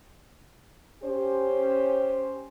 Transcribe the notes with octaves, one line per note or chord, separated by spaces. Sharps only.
C#4 G4 C5